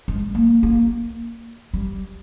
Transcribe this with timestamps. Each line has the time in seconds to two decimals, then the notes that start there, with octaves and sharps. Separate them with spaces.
0.08 G#3
0.35 A#3
0.63 A#3
1.74 G3